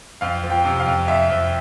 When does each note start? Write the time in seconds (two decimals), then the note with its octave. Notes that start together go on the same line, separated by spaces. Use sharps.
0.21 F2 F5
0.44 F3
0.50 G5
0.65 C3
0.79 F5
0.86 F2
1.08 F2 E5
1.30 F2